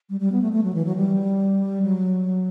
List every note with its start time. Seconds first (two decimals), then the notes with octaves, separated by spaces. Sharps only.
0.10 G3
0.20 G3
0.32 B3
0.42 A3
0.52 A3
0.63 F#3
0.74 E3
0.85 F#3
0.96 G3
1.82 F#3